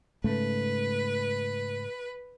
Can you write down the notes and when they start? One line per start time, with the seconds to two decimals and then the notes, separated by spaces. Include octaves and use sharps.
0.24 G#2 C#3 A3 B4